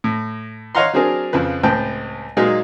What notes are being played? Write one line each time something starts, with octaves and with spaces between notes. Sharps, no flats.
A2
C#5 D#5 F5 F#5 A#5 C6
F#3 C4 D4 G#4 A#4
F2 C#3 F3 B4
C#2 A2 C4 G5 A5
A#2 F#3 G#3 A#3 D#4 G#4